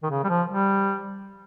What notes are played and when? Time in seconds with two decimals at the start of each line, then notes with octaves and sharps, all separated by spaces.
0.03 D#3
0.10 C#3
0.24 G3
0.29 F3
0.48 G3